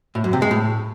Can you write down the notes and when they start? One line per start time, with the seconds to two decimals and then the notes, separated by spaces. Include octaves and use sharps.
0.15 A2
0.24 F#2
0.33 C3
0.42 G#3
0.51 A2